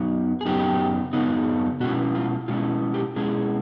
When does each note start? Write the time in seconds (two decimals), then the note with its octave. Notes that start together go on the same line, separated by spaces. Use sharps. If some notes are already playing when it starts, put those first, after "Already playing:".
Already playing: F#2 F#3 B3 D#4
0.41 G#4
0.46 F#2 C#3 F#3 B3 D#4 G4
1.13 F#2 C#3 F#3 B3 D#4
1.80 B2 G#3 C#4 E4 F#4
2.15 F4
2.48 B2 G#3 C#4 E4 F4
2.94 G4
3.16 B2 G#3 C#4 E4 G#4